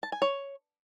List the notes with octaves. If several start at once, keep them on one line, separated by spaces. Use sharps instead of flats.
A5
G#5
C#5